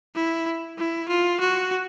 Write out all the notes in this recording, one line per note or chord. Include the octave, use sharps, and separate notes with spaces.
E4
E4
F4
F#4